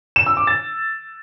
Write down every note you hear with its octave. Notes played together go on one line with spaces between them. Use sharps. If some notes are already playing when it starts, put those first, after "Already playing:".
E7
E6
D6
A6